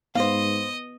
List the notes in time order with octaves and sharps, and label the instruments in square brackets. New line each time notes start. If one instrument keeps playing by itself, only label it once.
[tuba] G#2 [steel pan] B3 [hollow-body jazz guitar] C5 F5 [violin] D#5